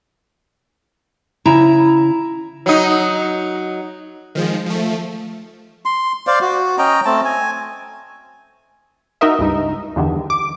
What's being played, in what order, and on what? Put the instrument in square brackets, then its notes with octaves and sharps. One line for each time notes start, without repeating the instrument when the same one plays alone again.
[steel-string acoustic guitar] C#3 E4 A#5
[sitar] F#3 D#4
[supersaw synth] D#3 F3 G#3
F3 A3
[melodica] C6
C5 D5 F5
F#4
C#4 D#5 G5 A#5
A3 C4 A5
G#5
[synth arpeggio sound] D#4 F#4 A#4 D#5 E5
C#2 G2 D#4
E2 G2 D3 D#3
D6